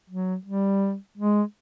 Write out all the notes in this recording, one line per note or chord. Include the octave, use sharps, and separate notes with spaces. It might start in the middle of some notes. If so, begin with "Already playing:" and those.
F#3
G3
G#3